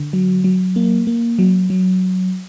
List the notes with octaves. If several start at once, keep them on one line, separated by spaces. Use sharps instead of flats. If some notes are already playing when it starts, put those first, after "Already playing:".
Already playing: D3
F#3
F#3
A#3
A#3
F#3
F#3